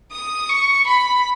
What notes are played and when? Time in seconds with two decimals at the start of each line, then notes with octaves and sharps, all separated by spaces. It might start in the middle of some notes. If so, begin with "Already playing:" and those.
0.12 D#6
0.49 C#6
0.87 B5